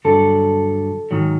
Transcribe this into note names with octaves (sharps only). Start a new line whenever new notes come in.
G2 D3 F#3 A4
G#2 D#3 F#3